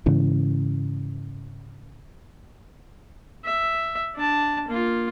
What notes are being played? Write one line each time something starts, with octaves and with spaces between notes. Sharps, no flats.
G#2 C#3 E3
E5
D4 A5
A#3 F4